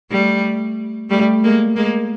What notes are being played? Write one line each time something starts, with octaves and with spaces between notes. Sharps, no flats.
G3 A3
G3 A3
G#3 A#3
G#3 A#3